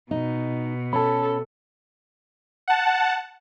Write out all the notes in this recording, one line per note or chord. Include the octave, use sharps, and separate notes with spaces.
B2 D#4
C#4 A4 A5 B5
F#5 A5